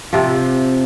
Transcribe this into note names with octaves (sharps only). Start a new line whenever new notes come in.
C3 F3